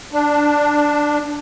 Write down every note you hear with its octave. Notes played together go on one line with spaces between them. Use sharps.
D4